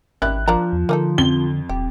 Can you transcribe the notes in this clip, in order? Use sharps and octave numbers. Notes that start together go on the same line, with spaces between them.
G#1 D#3 E4 G4 F#6
F3 A#3 D4 A#5
E2
D3 A#3 D#4 A4
F2 G7
D#1 G4